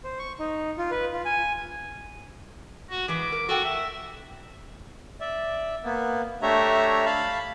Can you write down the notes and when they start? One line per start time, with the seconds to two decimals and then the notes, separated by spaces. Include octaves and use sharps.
0.04 C5
0.19 C#6
0.39 D#4
0.78 F4
0.91 B4
1.13 F4
1.25 G#5
2.90 F#4
3.08 E3 G#3 B4 D6
3.32 A#4
3.49 F#4 A4 A#4 G5
3.64 E5
5.21 D5 E5
5.84 A#3 B3
6.42 A3 D4 G4 C#5 E5 A#5
7.06 F5 A5 B5